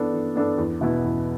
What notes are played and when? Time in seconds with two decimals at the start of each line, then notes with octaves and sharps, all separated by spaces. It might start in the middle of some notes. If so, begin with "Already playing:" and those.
Already playing: E3 B3 D4 A4
0.13 E3
0.36 B3 D4 A4
0.58 E2
0.81 B2 B3 E4
1.04 E2